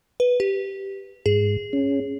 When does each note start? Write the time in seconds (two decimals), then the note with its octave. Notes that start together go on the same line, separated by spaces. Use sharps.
0.20 B4
0.40 G4
1.26 G#2 G#4
1.73 C#4